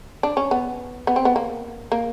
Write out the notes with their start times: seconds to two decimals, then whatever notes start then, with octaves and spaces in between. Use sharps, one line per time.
0.23 D4
0.37 C#4
0.51 B3
1.07 B3
1.16 C4
1.25 B3
1.36 A#3
1.92 A#3